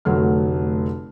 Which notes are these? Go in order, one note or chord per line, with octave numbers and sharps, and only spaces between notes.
F1 D3 F#3 A3 F6